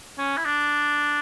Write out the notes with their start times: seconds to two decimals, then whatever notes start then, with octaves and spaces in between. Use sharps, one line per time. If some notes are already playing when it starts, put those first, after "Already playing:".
0.18 C#4
0.37 E4
0.45 D4